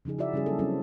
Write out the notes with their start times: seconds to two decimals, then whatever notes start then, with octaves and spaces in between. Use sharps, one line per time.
0.05 C#3 F3 D#4 G#4
0.18 E4 F#4 G#4 D5 E5
0.33 C#3 G3 C#4 F#4 G#4
0.46 F#3 A#3 A4
0.59 F#3 C4 C#4 E4 A4